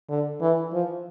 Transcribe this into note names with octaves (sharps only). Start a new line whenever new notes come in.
D3
E3
F3